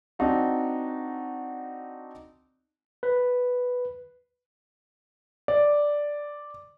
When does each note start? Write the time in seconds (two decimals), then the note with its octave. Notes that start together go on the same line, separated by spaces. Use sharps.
0.19 C4 D4 D#4 F#4
3.03 B4
5.48 D5